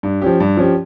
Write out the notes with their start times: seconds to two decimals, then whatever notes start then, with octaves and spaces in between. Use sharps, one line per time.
0.03 G2
0.21 F3 C#4 G4
0.40 G2
0.57 F3 C#4 G4